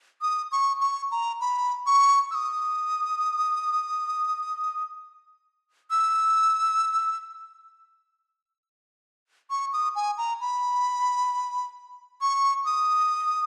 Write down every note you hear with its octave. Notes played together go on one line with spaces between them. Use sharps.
D#6
C#6
C#6
A#5
B5
C#6
E6
D#6
E6
C#6
D#6
G#5
A#5
B5
C#6
D#6